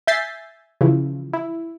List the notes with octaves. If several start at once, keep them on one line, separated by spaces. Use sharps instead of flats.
E5 G#5 G6 A6 B6 C7
C#3 E3 F3
E4